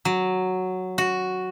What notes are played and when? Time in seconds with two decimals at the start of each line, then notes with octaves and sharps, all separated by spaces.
0.05 F#3
0.98 F#4